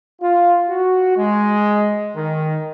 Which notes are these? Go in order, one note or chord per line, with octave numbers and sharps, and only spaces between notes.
F4
F#4
G#3
D#3